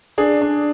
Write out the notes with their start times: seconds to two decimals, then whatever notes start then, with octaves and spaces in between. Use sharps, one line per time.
0.18 D4 G#4
0.42 D4